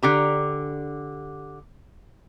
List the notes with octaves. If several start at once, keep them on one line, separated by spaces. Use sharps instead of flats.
D3 G4 A#5